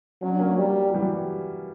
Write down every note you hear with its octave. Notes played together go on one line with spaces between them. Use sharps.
F#3 C#4
D4
A#3 C#4
G3
F#3
E3 G3